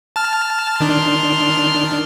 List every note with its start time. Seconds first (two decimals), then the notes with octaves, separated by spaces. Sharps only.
0.16 A5 F6
0.80 D#3 D4 C6 F6